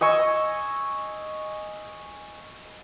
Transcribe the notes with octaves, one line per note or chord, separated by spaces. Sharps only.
D#5 G#5 C#6 E6